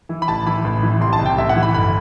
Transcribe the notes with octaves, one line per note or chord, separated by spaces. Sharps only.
E3
B5
A1 A5
E3 B5
A1
E3
C2 C6
A5
C2
G5
A1 E5
F#5
E3
B5
G1 B5